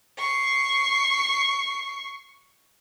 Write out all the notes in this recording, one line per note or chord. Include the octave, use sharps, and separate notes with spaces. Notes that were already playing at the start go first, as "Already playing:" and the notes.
C#6 C7